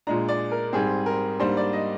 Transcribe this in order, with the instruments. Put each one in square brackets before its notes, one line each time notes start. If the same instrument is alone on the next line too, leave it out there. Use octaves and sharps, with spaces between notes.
[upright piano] A#2 G#3 D4 A#5
D5
A#4
G#2 G3 C4 G#4
A#4
G#2 G3 A#3 D4 C5
D5
D#5